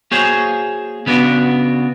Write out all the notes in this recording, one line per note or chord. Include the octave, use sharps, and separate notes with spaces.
A#3 F#4 G#4 C5 C#5
C#3 B3 D4 F#4